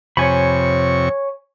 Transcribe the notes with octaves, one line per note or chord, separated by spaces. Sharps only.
F2 C3 C#5 G#5 B5 C#6